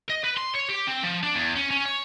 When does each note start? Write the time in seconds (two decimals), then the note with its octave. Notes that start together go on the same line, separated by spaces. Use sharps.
0.09 D#5
0.24 B4
0.37 C6
0.54 C#5
0.69 G4
0.87 C4
1.03 F3
1.23 D4
1.35 E2
1.56 C#4
1.71 C#4
1.85 C#5